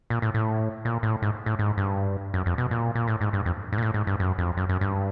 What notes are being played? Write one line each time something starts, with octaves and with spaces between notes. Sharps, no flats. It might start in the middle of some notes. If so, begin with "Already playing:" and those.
A#2
A2
A2
A#2
A2
G#2
A2
G#2
G2
F#2
F2
B2
A#2
A#2
A2
G#2
G2
F2
G#2
A#2
A2
G#2
G2
F#2
F2
F#2
F#2
G2